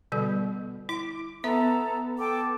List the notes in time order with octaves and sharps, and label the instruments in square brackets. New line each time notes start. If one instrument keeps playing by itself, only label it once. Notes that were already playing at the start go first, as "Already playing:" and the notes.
[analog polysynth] B2 [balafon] D3 G3 A4
[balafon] E4 [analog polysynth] D6
[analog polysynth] B3 [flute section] A4 A#5 [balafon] E5
[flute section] A4 G5 D6